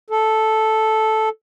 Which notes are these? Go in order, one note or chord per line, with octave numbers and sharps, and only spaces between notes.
A4